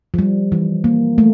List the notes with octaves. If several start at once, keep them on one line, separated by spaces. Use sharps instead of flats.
F3
G3
E3
A#3
A3